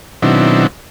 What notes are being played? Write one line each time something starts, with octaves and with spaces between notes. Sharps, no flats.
B2 D#3 F#3 C4 D4 E4